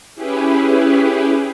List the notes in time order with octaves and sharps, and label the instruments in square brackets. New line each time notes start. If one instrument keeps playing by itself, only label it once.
[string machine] C#4 E4 G4 G#4 B4